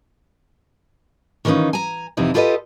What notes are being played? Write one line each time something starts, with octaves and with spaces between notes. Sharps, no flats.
D#3 E3 G3 C#4 D#4 F4
G#5 A#5
F2 C3 E3 F3 D#4 E4
E4 F4 G4 A4 B4 D#5